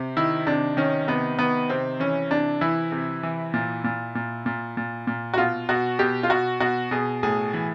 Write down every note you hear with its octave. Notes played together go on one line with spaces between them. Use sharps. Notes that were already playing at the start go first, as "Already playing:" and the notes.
Already playing: C3
D#3 E4
C3 D4
D#3 C#4
C3 B3
D#3 B3
C3 C4
E3 C#4
C3 D4
E3 E4
C3
E3
A#2
A#2
A#2
A#2
A#2
A#2
F#4
B2 F4
B2 F#4
B2 G4
F4
B2 F#4
B2 F#4
B2 G#4
A2 G#4
E3